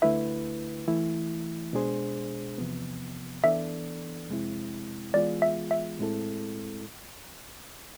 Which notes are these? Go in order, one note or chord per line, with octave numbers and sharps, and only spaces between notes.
D2 D3 A3 E4 B4 E5
E3 A3 E4
B2 G#3 D4 G#4 C5
E2 C3 F3 B3
E3 B3 D4 A4 D5 E5
F2 C3 G#3 C4 E4
E3 G#3 B3 F4 G#4 D5
E5
E5
A2 G#3 C4 E4 A4